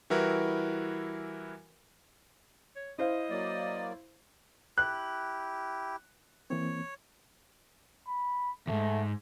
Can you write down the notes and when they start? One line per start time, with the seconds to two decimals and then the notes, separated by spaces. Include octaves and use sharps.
0.10 E3 G3 E4 F#4 A#4 B4
2.76 C#5
2.98 E4 C5 D#5 F5
3.30 F#3 A#3 D5
4.78 E4 G4 F#6
6.50 E3 A#3 C4 C#5
8.07 B5
8.67 D#2 G#2 A3